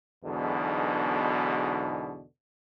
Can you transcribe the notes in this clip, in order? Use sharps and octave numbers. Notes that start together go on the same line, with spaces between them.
B1 E2 G#2 B2 D3